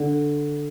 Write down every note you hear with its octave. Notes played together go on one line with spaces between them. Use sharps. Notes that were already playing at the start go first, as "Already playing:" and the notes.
Already playing: D3